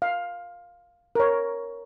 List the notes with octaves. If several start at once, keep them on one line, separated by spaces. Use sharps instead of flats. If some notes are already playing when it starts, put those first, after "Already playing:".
F5
A#4 C#5